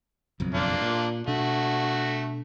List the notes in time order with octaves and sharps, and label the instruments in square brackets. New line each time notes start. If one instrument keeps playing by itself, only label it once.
[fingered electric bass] F#1 B1 F2
[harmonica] A#3 D4 F4
[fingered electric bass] A#2
[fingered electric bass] B2 D4 [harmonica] A3 F#4